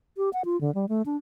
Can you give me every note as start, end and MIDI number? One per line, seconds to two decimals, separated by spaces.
0.17 0.30 67
0.33 0.42 78
0.45 0.59 65
0.61 0.73 50
0.75 0.86 55
0.89 1.02 57
1.06 1.16 62